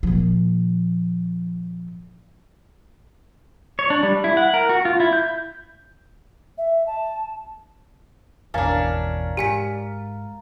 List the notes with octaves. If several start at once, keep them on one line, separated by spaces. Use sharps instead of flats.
A#2 F3
C#5
D4
G3
E4
F#5
A#4
F#4
F4
E4
G6
E5
A5
G#1 E2 B2 C#4 D4 A#4 F5 A5
G#2 G4 G#5 B6